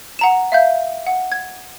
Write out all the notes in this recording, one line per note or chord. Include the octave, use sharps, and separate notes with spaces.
F#5 A#5 E7
E5 F5 G6
F#5
G#6